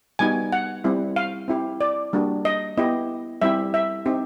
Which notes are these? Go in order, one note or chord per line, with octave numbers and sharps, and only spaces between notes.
G3 B3 D#4 F#4 G#5
F#5
G3 C4 E4
F5
C4 E4 G4
D5
G3 A#3 D4 F#4
D#5
B3 E4 G4 D#5
G3 C4 E4 G4 E5
E5
C4 D#4 G4